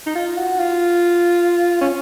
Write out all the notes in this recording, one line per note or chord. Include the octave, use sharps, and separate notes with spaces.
D#4
F4
F#4
F4
C#4